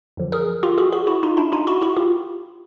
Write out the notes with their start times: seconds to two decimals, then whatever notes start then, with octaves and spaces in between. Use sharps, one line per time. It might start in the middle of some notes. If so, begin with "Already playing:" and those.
0.17 F#2 D3 F3
0.32 G#4 A#4
0.63 F4 G4
0.78 F#4 G#4
0.92 F#4 G#4
1.07 E4 F#4
1.23 D#4 F4
1.37 D4 E4
1.52 D#4 F4
1.67 E4 F#4
1.82 E4 F#4
1.96 F4 G4